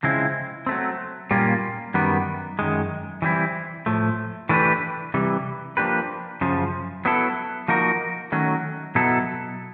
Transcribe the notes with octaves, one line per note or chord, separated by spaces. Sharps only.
C#3 F3 G#3 C4 E4
F#3 A3 C4
A#2 G3 A#3 C#4 F4
F#2 D#3 G3 B3
F#2 D#3 G#3
E3 G3 C4 E4
A2 F3 A3
E3 A3 D4 G4 B4
C3 E3 G3
F3 A#3 D4 G4 B4
F#2 C#3 F3
F#3 B3 E4 A4
F3 A#3 D#4 F#4 A#4
D#3 F#3 A3 C#4
B2 F#3 B3 E4 A4